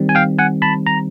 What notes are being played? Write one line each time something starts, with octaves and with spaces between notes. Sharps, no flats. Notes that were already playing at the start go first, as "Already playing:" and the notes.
Already playing: D#3 G3 C4
G#5
F5 G5
F#5 G#5
A5 B5
A#5